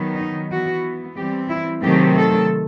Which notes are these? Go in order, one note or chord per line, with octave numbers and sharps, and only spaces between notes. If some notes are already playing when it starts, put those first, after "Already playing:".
Already playing: D#3 F#3 B3
D#4
E3 B3 F#4
E3 G3 C4 G4
E4
C3 D#3 F#3 A3 C4 G4
A4